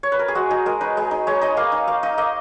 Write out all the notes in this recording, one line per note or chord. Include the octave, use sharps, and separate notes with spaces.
C#5
B4
A#4
G#4
G#3 F#4
D#4 G#4
G#3 A#4
D#4 B4
G#3
D#4
G#3 C#5
D#4 D#5
A#3 F5
D#4
A#3 F5
D#4 D#5
A#3 D#5